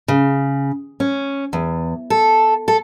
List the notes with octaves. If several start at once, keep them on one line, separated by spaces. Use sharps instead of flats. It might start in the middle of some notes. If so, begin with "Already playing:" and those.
C#3
C#4
E2
A4
A4